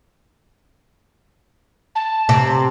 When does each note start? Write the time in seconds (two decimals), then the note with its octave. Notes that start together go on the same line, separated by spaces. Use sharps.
1.95 A5
2.29 C3